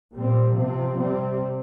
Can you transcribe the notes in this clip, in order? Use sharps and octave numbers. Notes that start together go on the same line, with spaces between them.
A#2 G3 C4
C3 F3 C4
C3 G3 C4